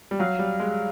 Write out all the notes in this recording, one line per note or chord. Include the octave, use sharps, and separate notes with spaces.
G3
F#3 F5
G3
G#3